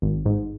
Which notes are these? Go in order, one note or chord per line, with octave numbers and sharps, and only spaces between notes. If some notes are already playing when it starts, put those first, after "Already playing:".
G#1
G#2